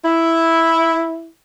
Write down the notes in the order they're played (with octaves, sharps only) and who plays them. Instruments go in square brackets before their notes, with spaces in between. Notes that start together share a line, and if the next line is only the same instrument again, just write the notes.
[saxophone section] E4